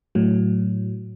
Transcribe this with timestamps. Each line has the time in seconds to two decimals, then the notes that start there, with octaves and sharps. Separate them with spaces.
0.15 A2 F#3